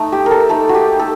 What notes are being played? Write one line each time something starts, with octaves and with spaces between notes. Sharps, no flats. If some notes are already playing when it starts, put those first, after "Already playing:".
Already playing: A3 D#4 A4
G4
A4 A#4
A3 D#4 A4
F#4
G4
A4